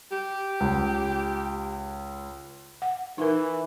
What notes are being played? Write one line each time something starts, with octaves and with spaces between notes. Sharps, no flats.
G4
C#2
F#5
E3 D#4 A#4